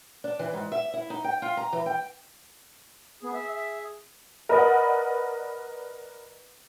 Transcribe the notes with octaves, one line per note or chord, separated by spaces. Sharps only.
D4
E3
G#2
E5
E4
D#4
G5
F4
A#5
E3
G5
B3 G#4
E5
E5
A#4 B4 D5 D#5 F#5